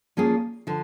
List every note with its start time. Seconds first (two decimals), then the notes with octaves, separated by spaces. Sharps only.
0.17 F3 A#3 C#4 F4 G#4
0.67 D3 F3